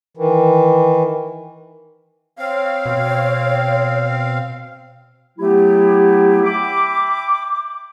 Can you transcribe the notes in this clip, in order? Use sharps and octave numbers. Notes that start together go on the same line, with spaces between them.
D#3 E3
C4 C#5 F5
B2
F#3 A3 B3 E4 G4
E5 G5 B5 D6